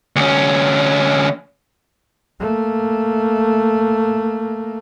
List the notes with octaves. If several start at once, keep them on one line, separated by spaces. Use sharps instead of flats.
D2 C#4
A3 A#3